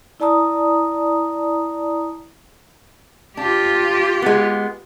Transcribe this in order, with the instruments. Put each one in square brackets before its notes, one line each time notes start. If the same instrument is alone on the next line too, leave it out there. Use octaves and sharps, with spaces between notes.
[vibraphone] E4 D5 A5 A#5 D#6
[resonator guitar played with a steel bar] D4 [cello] F4 G4
[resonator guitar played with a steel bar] G#3 B3